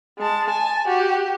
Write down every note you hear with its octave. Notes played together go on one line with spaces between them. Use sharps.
G#3 A5
G#5 A5
F#4 G4